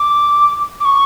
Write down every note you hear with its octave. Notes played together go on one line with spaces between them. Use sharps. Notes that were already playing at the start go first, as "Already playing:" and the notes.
Already playing: D6
D6
C#6